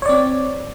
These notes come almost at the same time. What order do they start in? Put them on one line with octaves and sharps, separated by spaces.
C#5 D5 C4